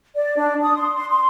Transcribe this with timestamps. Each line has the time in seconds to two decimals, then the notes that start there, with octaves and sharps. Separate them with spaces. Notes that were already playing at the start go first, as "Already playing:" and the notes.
0.15 D5
0.37 D4
0.62 D#6
0.76 C6
0.96 C6
1.11 C6